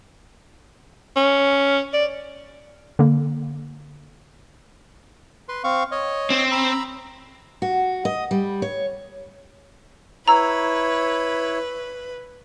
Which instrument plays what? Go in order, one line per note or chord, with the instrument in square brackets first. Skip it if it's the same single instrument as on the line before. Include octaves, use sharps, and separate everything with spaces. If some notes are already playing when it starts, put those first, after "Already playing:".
[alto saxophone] C#4
D5
[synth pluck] D3 A#3
[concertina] B4 C6
C4 F5 C#6
C#5 D#5
[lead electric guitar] C4
[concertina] A#5 B5 E6
[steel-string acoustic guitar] F#4
D#5
G3
C#5
[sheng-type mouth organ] E4 C#5 [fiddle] B4 [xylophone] A#5 E6